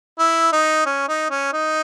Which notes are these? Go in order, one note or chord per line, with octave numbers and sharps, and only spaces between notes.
E4
D#4
C#4
D#4
C#4
D#4